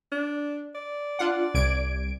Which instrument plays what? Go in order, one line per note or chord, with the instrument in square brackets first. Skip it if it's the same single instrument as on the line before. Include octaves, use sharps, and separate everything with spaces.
[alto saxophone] D4
D5
[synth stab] D4 F4 F#5
C2 G#6 D7